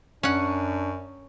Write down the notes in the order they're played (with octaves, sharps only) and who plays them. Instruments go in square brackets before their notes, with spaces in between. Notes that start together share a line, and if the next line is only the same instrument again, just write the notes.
[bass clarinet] F#2 [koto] C#4 F#5 [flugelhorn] D4